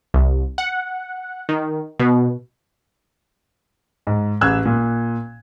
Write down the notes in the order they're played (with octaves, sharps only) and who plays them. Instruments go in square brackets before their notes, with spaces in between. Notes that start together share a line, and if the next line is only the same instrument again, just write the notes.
[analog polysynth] C2
F#5
D#3
B2
[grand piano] G#2
A1 G#4 E6 F#6 G#6
A#2